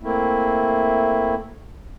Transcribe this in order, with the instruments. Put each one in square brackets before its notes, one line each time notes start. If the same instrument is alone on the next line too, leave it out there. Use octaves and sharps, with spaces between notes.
[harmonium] A3 A#3 C4 E4